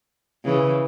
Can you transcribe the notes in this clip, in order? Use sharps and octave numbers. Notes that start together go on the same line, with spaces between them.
C#3 E3